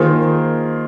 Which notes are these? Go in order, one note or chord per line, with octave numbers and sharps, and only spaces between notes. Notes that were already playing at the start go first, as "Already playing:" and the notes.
Already playing: D#3 A#3 F4 G#4 C5